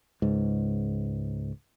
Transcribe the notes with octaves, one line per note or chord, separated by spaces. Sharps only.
C#2 G#2